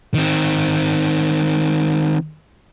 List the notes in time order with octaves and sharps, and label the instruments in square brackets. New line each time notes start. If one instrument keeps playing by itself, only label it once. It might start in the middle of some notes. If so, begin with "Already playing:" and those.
[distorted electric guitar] D#3 C4